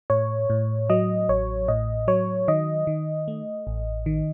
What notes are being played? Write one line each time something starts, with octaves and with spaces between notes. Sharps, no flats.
A2 C#5
A2
F#3 D#5
A1 C#5
A2 D#5
F#3 C#5
D#3 D#5
D#3
A3
A1
D#3